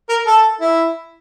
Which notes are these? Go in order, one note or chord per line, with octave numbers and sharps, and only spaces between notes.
A#4
A4
E4